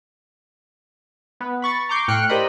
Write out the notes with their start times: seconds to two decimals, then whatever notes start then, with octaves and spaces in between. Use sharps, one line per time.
1.40 B3 B4
1.62 B5 C#6 A6
1.89 A#5 C#6 D6 G6 C7
2.08 A2 G5 F6 F#6 C#7
2.29 G4 A#4 C5 D5 D#5 B5